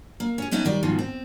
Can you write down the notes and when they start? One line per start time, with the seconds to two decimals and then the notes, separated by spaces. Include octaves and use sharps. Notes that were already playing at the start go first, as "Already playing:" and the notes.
0.20 A#3
0.38 C#4 G#4
0.51 A3 B3 C#4 D#4 E5 F#5
0.65 D#3 G3 D5
0.83 G#2 B2 D#3 F3
0.99 C4